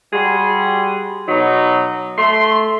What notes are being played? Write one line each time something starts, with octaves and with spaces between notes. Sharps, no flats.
G3 F#4 G#4 C6
B2 F#3 D#4
A3 C6